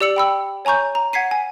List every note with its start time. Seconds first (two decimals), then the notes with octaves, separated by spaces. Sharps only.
0.01 G4 D5 E6 C#7 F#7
0.16 G5 B5 E6
0.65 C#5 G#5 A#5 C#6 G6
0.95 A#5
1.13 F#5 G#6 B6 C7 D#7
1.31 G#5